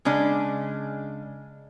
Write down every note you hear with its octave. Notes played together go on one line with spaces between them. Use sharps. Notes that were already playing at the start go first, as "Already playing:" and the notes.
C#3 G#3 D4